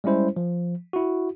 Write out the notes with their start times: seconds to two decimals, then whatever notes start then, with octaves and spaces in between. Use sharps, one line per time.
0.04 G3 G#3 C#4 E4 C5
0.36 F3
0.93 E4 F#4